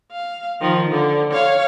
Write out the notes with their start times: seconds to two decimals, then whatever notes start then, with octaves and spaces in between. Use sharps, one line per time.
0.12 F5
0.61 D#3 F3
0.91 D3
1.33 C#5 F5